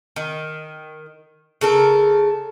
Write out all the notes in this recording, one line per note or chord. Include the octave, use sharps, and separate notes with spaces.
D#3
C#3 A4 A#4